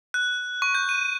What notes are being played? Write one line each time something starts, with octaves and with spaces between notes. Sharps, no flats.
F#6
C#6
G6
D#7